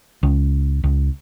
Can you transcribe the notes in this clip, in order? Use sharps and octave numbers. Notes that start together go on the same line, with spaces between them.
C#2
C#2